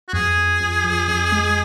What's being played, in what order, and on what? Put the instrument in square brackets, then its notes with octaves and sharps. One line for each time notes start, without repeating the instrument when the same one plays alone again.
[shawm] F#4
[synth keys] F2 [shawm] G#4
[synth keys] F2
F2
F2
F2
G#3